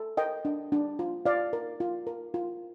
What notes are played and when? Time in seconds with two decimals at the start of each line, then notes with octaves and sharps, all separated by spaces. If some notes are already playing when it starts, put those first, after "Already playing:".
Already playing: A4
0.17 A#4 D#5 G5
0.45 D4
0.72 D4
0.99 F4
1.26 F4 D5 F5
1.53 A#4
1.80 F4
2.07 A#4
2.34 F4